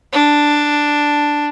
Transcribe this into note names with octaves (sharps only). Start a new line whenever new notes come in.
D4